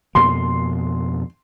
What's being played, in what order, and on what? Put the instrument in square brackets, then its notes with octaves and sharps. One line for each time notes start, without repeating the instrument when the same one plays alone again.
[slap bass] F2 B2 A#3 [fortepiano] C6